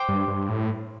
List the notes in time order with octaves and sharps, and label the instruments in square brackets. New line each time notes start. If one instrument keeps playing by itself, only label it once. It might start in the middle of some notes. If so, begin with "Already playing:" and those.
Already playing: [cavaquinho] C5 G5 D6
[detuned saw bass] G2
G2
A2